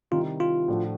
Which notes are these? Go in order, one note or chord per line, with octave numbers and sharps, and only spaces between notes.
C3 D#3 G3 C4 E4 F4
F4
A2 F3 A3 D4 F#4